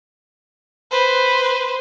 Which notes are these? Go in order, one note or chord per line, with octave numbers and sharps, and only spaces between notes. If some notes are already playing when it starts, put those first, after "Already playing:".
B4 C5